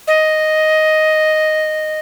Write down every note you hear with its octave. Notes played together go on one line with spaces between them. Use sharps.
D#5